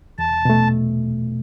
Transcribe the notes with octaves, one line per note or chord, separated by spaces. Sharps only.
E2 A5
B2 A3